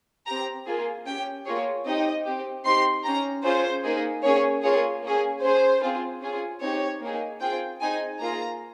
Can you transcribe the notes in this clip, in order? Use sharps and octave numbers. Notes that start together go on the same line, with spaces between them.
C4 G4 A#5
A#3 F4 G#4
C#4 G4 G5
A#3 F4 G#4 C#5
C4 D#4 G4 D#5
C4 G4
C4 D#4 G4 C6
C#4 G4 A#5
C#4 F4 G#4 C5
A#3 D#4 G#4
A#3 C#4 G#4 C#5
A#3 F4 G#4 C#5
A#3 C#4 G#4
C#4 G#4 C5
C4 F4 G#4
C#4 F4 G#4
C4 D#4 G4 C#5
A#3 D#4 G#4
C4 F4 G#4 G5
C4 D#4 G#4 G#5
A#3 F4 G#4 A#5